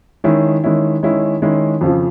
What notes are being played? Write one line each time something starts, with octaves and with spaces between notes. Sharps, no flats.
D#3 G#3 C#4 E4
D#3 G#3 C#4 E4
D#3 G#3 C#4 E4
D#3 G#3 C#4 E4
F2 C#3 F3